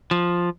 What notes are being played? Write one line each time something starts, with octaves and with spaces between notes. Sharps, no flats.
F3